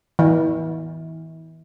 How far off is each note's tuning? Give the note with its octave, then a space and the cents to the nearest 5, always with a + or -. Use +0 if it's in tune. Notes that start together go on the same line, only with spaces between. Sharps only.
E3 -35